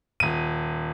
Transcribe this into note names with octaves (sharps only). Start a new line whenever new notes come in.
D#1 D#7